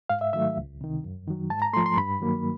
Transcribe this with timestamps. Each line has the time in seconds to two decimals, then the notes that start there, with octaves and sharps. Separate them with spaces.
0.10 G#2 F5
0.21 E5
0.33 D#3 F#3 A3 E5
0.57 C#2
0.81 C3 D#3
1.04 F#2
1.27 D#3 F#3
1.50 G#2 A5
1.62 A#5
1.74 F3 A3 C6
1.86 C6
1.97 G2 B5
2.20 D#3 F#3 A#3